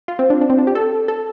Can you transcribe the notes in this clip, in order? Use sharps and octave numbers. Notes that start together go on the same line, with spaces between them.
F4
C4
D4
D4
C4
D4
G4
A4
A4